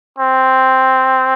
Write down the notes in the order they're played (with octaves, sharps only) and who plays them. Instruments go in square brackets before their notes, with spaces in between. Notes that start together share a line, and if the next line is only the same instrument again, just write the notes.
[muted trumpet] C4